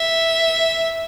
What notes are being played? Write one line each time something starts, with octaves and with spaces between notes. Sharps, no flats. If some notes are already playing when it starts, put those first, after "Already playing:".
Already playing: E5